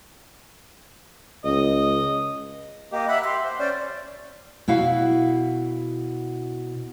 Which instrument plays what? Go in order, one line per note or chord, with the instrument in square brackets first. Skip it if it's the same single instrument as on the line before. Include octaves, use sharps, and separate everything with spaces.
[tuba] C#2 [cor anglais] D#5
[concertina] A#3 G4 [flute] D#5
[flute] E5 [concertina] F#5 B5
[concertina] G4 [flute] C6
[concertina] C5
[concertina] C#4 C5 [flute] D5
[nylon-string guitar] B2 E4 F#4 F5